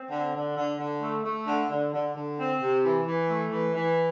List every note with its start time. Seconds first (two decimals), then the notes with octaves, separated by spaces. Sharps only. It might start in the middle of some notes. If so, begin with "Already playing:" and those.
Already playing: C4
0.11 D3
0.34 D3
0.56 D3
0.79 D3
1.01 A3
1.25 A3
1.47 D3
1.70 D3
1.93 D3
2.15 D3
2.38 C4
2.61 C3
2.84 E3
3.07 E3
3.30 A3
3.51 E3
3.75 E3